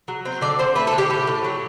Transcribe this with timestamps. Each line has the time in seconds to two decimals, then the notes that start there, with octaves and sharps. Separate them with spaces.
0.08 F#3
0.25 C4
0.41 D3 D5
0.59 C4 C5
0.76 A3 B4
0.87 A4
0.93 D3
0.98 G4
1.10 A2 G4
1.27 A2
1.44 F#3